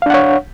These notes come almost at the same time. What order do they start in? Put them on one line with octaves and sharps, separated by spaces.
F5 D4 F#5 C#5